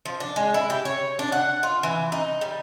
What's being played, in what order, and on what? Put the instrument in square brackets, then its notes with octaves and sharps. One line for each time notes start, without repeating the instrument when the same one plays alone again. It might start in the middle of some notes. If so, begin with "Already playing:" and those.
[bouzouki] F3
D4
G#3
E4
G4
C#5
D4
F#5
F4
E3
D#4
G3